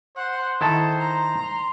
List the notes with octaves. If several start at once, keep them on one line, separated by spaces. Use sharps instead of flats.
C5 F#5
D#3 E4 A4 C5 A5
A#5
C6